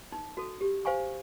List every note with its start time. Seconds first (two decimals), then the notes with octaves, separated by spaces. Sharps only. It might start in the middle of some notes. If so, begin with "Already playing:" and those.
0.12 D#4
0.37 F#4 A4
0.61 G4
0.85 C5 F5 G#5 C#6